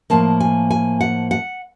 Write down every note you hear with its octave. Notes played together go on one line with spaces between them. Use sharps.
A2 F3 A#3 A5
G#5
G#5
F#5
F#5